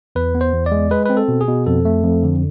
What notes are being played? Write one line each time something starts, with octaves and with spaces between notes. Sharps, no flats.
E2 B4
B3
C5
E2
D5
G#3
G#3 B4
C4 B4
A4
B2
G#4
B2
F2 A4
A3
F2
D3